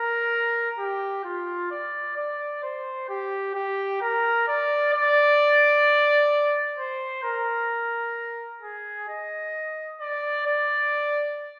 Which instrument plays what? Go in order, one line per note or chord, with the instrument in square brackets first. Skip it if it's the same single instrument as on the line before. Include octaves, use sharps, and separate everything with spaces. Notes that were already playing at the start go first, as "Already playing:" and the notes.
Already playing: [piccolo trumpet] A#4
G4
F4
D5
D5
C5
G4
G4
A#4
D5
D5
C5
A#4
G#4
D#5
D5
D5